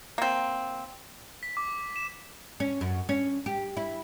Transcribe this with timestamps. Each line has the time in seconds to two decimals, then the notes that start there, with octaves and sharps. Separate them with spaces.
0.18 A#3 C4
1.43 B6
1.57 D6
1.96 E7
2.60 C#4
2.81 F#2
3.09 C#4
3.46 G4
3.77 E4